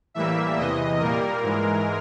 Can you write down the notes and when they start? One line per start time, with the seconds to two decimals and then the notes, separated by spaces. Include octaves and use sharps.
0.14 A2 E3 G3 A#3 E5
0.57 E2 C3 E3 D#5
1.00 A#2 G3 A#3 A#4
1.43 G#2 E3 G#3